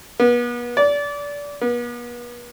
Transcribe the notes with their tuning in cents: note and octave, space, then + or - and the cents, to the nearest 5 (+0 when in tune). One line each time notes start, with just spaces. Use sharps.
B3 -35
D5 -25
B3 -40